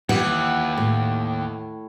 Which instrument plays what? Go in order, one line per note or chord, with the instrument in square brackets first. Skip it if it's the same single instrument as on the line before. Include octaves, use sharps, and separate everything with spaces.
[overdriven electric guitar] D#2 [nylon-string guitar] E3 [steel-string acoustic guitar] F#5
[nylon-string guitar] A2